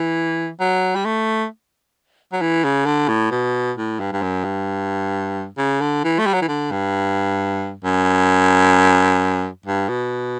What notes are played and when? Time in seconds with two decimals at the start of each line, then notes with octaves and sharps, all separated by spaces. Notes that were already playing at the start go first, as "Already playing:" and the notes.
Already playing: E3
0.60 F#3
0.95 G3
1.05 A3
2.33 F#3
2.41 E3
2.64 C#3
2.86 D3
3.08 A2
3.31 B2
3.77 A2
4.00 G2
4.13 G2
4.22 F#2
4.44 G2
5.58 C#3
5.81 D3
6.04 E3
6.19 A3
6.26 G3
6.34 F#3
6.42 E3
6.48 D3
6.72 G2
7.84 F#2
9.66 G2
9.89 B2